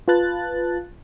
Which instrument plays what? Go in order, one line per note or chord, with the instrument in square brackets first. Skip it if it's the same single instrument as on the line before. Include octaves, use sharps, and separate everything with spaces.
[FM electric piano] F4 B4 A5 F#6 A6